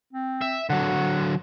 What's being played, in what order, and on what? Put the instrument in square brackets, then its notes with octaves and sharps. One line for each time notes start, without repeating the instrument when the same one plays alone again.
[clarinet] C4
[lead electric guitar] E5
[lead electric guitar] D3 F#3 [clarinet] F#5